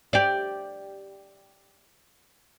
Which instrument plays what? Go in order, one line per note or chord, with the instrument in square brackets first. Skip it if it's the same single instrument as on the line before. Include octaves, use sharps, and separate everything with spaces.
[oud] G4 D5